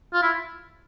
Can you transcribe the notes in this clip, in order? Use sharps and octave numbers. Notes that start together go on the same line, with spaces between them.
F4
E4